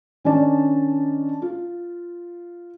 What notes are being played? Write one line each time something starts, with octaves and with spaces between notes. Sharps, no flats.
D#3 C#4 D4 D5 A5
F4